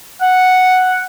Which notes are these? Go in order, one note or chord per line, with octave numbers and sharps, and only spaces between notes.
F#5